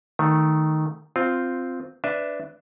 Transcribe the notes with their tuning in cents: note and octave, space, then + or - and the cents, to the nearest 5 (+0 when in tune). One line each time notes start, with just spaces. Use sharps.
D#3 +0 A3 +0
C4 -5 F4 +0
D4 +0 B4 +15 E5 +0